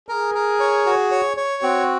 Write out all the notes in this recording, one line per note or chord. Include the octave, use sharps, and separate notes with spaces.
G#4 A#4
A#4
C#5
F#4
C#5
C#5
C4 F#4